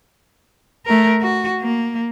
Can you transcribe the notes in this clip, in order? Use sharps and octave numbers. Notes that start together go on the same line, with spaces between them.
A3 A#4
F#4
A#3